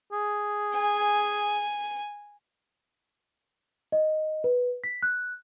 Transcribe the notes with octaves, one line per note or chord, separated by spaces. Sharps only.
G#4
G#5
D#5
B4
B6
F#6